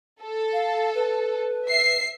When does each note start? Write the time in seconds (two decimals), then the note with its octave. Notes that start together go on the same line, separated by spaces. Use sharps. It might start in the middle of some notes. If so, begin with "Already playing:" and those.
0.21 A4
0.53 F5
0.95 B4
1.66 E5 C7